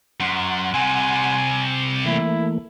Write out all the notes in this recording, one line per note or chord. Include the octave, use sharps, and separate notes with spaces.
F#2 F#5 C6
C3 G3 G#5
E3 A3 A#3 E4